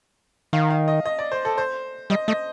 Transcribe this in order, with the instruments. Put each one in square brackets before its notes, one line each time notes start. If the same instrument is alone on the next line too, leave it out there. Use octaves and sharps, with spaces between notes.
[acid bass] D#3 [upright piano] F5
[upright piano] F5
D#5
D#5
D5
C5
A4
C5
[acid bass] G3 [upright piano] D#5
[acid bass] A3 [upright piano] D#5